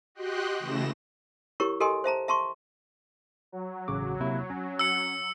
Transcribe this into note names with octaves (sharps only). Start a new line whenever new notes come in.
F#4 G4 D#5 G5 C6 F#6
C#3 E3 A3 A#6 E7
E4 G4 A#4 C#5 C#6
G4 A4 A#4 D#5 G#5 C6
C5 E5 A5 A#5
E5 A5 C6 C#6
F#3
A1 C#3 D6
C3 A#3 E4
C#4
E6 C#7